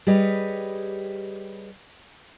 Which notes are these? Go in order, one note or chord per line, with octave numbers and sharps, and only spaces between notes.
G3 G4 G#4 B4 C#5 D#5